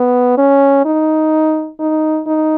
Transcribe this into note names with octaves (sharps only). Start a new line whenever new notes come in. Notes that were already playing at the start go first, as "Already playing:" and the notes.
Already playing: B3
C#4
D#4
D#4
D#4